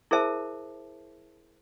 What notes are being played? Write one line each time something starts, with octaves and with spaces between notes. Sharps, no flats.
E4 G#4 A#4 C5 E5 A5